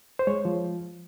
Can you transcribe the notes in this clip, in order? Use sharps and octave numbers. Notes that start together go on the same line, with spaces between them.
C5
G#3 C#5
F3